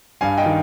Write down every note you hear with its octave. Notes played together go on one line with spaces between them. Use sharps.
G2 F5 G#5
D#5 G5
D#3